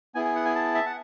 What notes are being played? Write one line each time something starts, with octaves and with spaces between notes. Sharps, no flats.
B3 E4 G#4 G#5
G#5
F#5
G#5
A5
E5
F#5